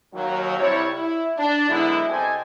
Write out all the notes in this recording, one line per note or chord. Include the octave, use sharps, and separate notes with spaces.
D#2 F#3
C2 G3 E4 C#5
E4
D4
D3 F#3 G#3 B3 E4
C2 G4 A4 C5 D#5 G#5